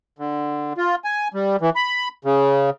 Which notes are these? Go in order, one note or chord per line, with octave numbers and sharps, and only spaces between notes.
D3
F4
G#5
G3
E3
B5
C#3